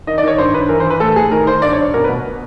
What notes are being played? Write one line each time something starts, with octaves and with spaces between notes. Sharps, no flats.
D#3 D#5
D5
D#3 C#5
G2 C5
G2 B4
E3 A#4
C5
E3
B4
A2 A4
A2 G#4
D#3 A#4
D#3 C5
G2 D5
C#5
G2
B2 A#4
B4
B2